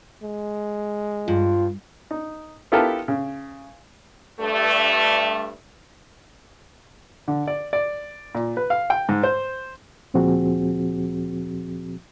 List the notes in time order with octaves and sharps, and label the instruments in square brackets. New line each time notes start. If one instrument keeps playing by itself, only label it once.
[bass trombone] G#3
[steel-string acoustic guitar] G2 [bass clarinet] F4
[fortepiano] D#4
B3 E4 F4 G4 A4 A#4
C#3
[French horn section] G2 A3
[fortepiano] D3
D5
D5
A#2
B4
F5
G5
G#2
C5
[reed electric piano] D2 A#2 F3 C4 F#4 G#4